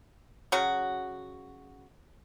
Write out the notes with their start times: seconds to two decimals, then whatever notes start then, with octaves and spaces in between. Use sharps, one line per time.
0.52 C#3 F#3 F#4